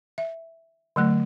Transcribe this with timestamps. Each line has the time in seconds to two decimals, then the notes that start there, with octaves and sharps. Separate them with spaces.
0.18 E5
0.96 D3 F#3 A3